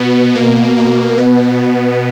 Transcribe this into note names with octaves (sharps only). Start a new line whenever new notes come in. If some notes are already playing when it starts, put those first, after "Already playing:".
Already playing: B2 B3
B2 A#3
A#3
B2 B3